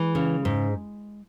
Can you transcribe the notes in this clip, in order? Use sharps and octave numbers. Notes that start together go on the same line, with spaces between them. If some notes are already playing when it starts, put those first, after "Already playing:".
Already playing: E3 G#3
C#3
G#2